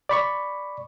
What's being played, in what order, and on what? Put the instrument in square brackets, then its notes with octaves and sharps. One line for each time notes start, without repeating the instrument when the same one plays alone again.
[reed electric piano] D5 B5 C#6